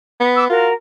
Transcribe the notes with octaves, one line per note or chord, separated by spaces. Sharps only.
B3
D6 E6
F4 F#4 A#4